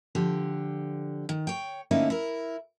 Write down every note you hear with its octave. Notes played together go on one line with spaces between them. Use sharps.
D3 F3 G4
D#3
C#5 G5
D3 A3 A#3 C#4 D#4 E4
E4 A#4